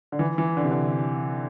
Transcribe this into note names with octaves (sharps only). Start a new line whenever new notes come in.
D3
E3
E3
D3
C3
D3